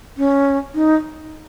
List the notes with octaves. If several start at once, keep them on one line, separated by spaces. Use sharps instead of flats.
C#4
D#4